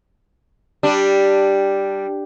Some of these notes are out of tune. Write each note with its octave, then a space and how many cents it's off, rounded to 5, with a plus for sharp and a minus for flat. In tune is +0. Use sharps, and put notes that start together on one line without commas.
G3 +0 D4 +0